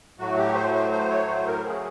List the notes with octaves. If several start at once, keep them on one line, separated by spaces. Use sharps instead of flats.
A2 F#3 A3 F#4
G4
C5
C5
C5
C#5
C5
A#4
C#3 F#3 A3 G#4